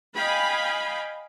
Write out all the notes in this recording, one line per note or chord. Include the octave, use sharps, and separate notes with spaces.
D#5 F5 G5 G#5 B5